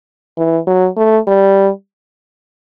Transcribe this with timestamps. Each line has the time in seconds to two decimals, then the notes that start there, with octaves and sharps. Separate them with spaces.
0.37 E3
0.67 F#3
0.97 A3
1.28 G3